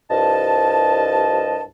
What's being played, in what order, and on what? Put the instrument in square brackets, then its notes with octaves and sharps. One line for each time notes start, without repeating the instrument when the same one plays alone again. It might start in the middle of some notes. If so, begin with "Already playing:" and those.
[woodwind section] C2 G2 F3 D#5 A5